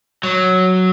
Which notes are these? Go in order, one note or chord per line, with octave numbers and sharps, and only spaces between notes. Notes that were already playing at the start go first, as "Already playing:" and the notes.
F#3